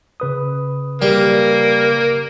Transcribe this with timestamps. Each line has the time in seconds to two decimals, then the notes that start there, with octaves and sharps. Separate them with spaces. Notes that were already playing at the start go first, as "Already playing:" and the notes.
0.20 C#3 B4 D#6
1.02 G3 A#3